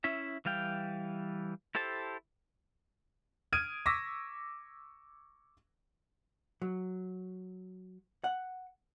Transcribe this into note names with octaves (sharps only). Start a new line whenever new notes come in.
C#4 E4 E5
E3 G3 F5 G5
E4 G4 A4 C5 A5
D#6 F6 G#6 D7 D#7
C#6 D6 E6 A#6 B6
F#3
F#5